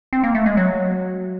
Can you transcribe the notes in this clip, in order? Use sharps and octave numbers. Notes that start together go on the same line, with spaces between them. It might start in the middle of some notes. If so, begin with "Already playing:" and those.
C4
A#3
A3
G#3
F#3